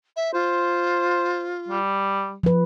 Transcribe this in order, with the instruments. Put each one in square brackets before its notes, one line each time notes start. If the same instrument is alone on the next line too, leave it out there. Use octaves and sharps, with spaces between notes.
[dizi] E5
[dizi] F4 [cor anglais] C5
[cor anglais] G3
[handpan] F3 B4